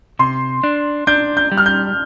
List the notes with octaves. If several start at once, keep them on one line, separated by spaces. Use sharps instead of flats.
C3 C6
D4
D4 G6
G6
G3
F6
G6